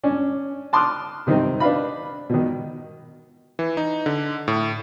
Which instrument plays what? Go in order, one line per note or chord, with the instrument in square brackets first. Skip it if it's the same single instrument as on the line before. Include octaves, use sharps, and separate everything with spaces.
[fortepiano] C#4 D4
A5 C6 D6 D#6 F6 F#6
C3 D#3 C4 D#4
D4 B4 F5 B5
B2 D#3
[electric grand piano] E3
D#4
D3
A2